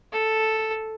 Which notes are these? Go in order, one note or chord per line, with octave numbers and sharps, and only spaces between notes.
A4